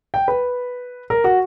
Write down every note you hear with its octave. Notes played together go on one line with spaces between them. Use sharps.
G5
B4
A#4
F#4